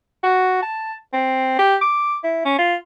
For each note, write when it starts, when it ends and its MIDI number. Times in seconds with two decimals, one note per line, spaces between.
0.23 0.61 66
0.62 0.94 81
1.13 1.58 60
1.59 1.76 67
1.81 2.18 86
2.24 2.44 64
2.45 2.58 61
2.58 2.75 65